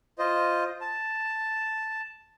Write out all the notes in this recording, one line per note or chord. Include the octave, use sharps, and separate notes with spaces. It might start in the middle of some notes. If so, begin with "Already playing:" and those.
F4 C5 D#5
A5